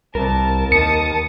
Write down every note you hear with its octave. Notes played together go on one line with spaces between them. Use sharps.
C2 A#4 A5
D#2 A5 D#6 C#7